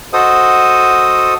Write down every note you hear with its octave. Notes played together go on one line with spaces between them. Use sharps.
F#4 A4 C5 D#5 D#6